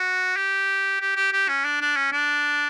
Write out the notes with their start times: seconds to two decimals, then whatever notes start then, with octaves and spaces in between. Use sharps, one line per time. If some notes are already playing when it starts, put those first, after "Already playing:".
Already playing: F#4
0.36 G4
1.01 G4
1.16 G4
1.33 G4
1.49 C#4
1.65 D4
1.81 D4
1.96 C#4
2.12 D4